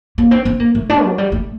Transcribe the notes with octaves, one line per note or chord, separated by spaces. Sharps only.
A#3
C4
C4
A#3
A3
D4
F#3
G3
A3